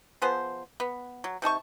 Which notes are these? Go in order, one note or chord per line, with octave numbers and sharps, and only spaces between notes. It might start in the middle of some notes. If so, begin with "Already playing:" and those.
F3 B3 G#4 C5
B3
F#3
C3 D#4 A5 C#6